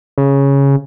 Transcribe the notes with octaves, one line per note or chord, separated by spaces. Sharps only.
C#3